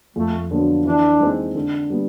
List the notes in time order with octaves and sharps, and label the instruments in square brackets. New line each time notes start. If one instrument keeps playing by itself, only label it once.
[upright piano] F2 [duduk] A3
[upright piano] D3 F#3 B3 D4
[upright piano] E3 [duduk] D4
[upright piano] G#3 C4 D#4
D3
G3 B3